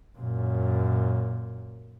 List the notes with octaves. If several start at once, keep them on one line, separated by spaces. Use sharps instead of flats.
F#2 A#2